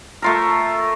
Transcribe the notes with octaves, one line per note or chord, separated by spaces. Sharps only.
A3 F4 A#4